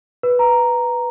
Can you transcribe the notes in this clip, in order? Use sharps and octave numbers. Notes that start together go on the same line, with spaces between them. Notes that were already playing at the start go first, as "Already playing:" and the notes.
B4
A#5